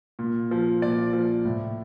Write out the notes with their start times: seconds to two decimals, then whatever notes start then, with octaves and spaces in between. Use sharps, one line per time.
0.19 A#2
0.51 F3
0.82 A#2 D5
1.13 F3
1.45 A2